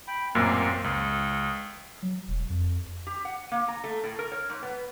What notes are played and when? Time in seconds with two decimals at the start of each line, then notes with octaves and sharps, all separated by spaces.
0.08 G5 B5
0.35 A1 F#2 A#2 A#3 C4
0.84 C#2 D#6
2.02 F#3
2.28 E1
2.50 F2
3.07 G4
3.25 F#5
3.52 A#3
3.68 A#5
3.84 A3
4.04 A2
4.19 A#4
4.32 C#5
4.50 G#2
4.62 B3